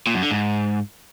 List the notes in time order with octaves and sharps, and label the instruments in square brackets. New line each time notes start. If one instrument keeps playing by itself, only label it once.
[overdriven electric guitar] A#2
F#2
D3
G#2